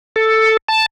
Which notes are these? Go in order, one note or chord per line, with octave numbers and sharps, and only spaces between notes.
A4
A5